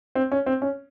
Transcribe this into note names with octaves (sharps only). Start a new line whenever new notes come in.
C4
C#4
C4
C#4